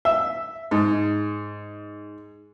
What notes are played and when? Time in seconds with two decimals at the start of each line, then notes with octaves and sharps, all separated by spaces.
0.05 E5
0.71 G#2